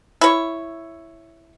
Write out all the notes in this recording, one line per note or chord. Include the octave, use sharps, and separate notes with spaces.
E4 C#5